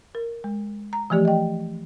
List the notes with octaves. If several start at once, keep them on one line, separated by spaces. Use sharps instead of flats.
A#4
G#3
A#5
E3 F3 A3 G4 D5
D#5 G5